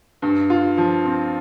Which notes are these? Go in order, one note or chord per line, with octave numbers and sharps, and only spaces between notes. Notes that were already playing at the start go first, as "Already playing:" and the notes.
G2
F4
F3
C4